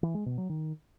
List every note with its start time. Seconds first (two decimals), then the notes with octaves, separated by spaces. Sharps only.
0.03 E3
0.14 G#3
0.26 B2
0.38 F#3
0.49 D#3